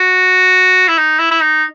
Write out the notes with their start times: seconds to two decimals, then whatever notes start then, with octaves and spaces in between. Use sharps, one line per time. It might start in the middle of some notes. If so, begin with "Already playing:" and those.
Already playing: F#4
0.88 E4
0.98 D#4
1.19 E4
1.31 E4
1.41 D#4